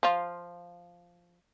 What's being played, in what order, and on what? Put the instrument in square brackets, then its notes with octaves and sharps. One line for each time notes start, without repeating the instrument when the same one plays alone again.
[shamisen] F3 F4